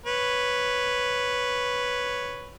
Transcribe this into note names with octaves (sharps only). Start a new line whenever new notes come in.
B4 C#5